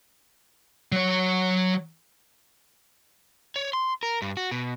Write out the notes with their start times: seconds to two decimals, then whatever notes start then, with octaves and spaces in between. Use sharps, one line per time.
0.92 F#3 C#5
3.56 C#5
3.73 C6
4.03 A#4
4.22 G2
4.37 F#4
4.51 B2